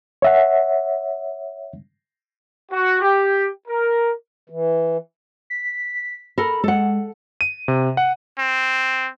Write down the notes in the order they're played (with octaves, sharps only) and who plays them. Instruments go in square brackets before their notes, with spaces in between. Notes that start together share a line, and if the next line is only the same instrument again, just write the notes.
[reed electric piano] C#5 E5 F#5
[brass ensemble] F#4
G4
A#4
[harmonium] E3
[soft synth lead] B6
[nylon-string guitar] A4 A#4 [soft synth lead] B5
[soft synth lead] G#3 [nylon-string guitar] A4 F#5
[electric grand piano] D#7
C3
F#5
[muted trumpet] C4